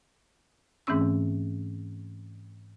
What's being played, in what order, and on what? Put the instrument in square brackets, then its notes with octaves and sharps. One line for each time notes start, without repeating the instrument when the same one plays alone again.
[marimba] G#2 E3 A3 C4 C#4 E6